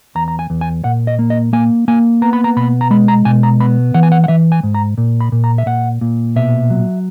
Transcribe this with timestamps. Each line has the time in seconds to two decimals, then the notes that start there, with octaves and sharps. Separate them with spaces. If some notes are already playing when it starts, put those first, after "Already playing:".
0.15 E2 A#5
0.28 A#5
0.39 G#5
0.50 E2
0.61 G#5
0.84 A#2 F#5
1.07 D#5
1.19 A#3
1.30 D#5
1.53 A#3 G#5
1.88 A#3 G#5
2.22 B3 A#5
2.33 B5
2.44 A#5
2.57 B2 B5
2.81 A#5
2.91 G#3 B5
3.08 A#5
3.25 B2 G#5
3.43 A#5
3.60 B3 B5
3.94 E3 F#5
4.03 G#5
4.12 F#5
4.24 F#5
4.28 E3 E5
4.52 G#5
4.63 G#2
4.75 A#5
4.98 A#2
5.21 B5
5.32 A#2
5.44 A#5
5.58 E5
5.66 A#2 F#5
6.01 A#2
6.36 B2 E5
6.70 F#3